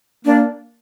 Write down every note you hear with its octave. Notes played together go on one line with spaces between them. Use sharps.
A#3 D4